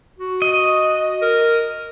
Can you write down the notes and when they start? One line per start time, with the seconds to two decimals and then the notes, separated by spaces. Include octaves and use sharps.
0.18 F#4
0.42 D#5
1.22 A#4